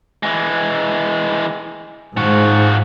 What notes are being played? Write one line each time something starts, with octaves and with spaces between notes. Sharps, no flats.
E3 G#3
G#2 F3 F#4